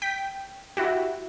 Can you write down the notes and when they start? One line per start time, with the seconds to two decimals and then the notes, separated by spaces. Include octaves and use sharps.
0.02 G5 B6
0.77 E4 F#4 G4